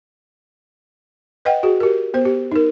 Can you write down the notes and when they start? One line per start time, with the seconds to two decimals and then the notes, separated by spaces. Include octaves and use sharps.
1.45 B4 D#5 F#5 G5
1.63 F#4 G#4
1.80 G4 A#4
2.14 B3 C5
2.25 G4
2.52 D#4 A#4